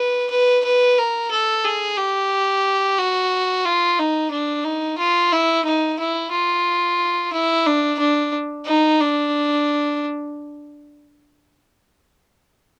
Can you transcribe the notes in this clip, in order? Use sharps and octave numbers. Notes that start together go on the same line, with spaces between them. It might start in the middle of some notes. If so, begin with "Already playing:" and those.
Already playing: B4
B4
B4
A#4
A4
G#4
G4
F#4
F4
D#4
D4
D#4
F4
E4
D#4
E4
F4
E4
D4
D4
D#4
D4